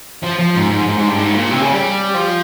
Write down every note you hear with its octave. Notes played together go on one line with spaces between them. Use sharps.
F3
F3
G#2
G#2
G#2
G#2
G2
G#2
A#2
C3
C#3
G3
F3